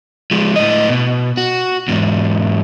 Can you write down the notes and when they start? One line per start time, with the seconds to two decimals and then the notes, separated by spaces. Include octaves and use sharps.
0.31 F3 G#3
0.56 A2 D#5
0.89 B2
1.37 F#4
1.88 E2 G#2